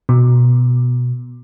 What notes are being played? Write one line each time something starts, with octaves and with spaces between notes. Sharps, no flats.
B2